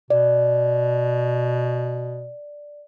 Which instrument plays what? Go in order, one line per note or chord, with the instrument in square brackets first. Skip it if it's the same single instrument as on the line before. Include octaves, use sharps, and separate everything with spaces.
[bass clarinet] B2 [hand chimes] D5